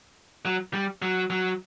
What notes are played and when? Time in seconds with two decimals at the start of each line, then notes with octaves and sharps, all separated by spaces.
0.45 F#3
0.74 G3
1.02 F#3
1.30 F#3